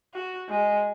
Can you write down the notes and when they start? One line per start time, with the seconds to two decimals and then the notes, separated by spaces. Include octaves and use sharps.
0.14 F#4
0.49 G#3